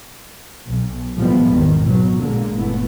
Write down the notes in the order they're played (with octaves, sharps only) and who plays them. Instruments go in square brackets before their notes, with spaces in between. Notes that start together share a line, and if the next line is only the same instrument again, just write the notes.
[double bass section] B1
A2 D#3 F3 G3 G#3 B3
G#1 E2 D#3
B2 F#3
A#1 A#2 D3 G#3 A#3
G1 A#2 E3 A3 B3